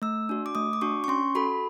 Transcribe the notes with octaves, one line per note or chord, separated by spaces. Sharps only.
A3 E6
D4 F#4
D6
A3 D#6
D6
D4 F#4 C#6
C#6
C#4 C6
F#4 A4 B5